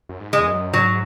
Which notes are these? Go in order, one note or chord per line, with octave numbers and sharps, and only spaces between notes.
F#2
G#2
G#3
E2
F#2
G#2 F#3